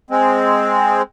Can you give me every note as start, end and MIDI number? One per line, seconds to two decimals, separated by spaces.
0.11 1.02 56
0.11 1.02 60